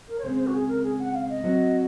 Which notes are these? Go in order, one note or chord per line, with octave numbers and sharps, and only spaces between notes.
A#4
C#5
C#3 G#3 C4 C5
C5
F#4
G#4
A#4
G#4
F#5
F5
D#5
F#3 C4 F#4